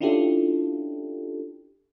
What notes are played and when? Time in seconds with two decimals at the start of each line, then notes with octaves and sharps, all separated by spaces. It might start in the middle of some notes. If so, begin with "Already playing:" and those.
0.01 C#4 D4 E4 F4 G4 A4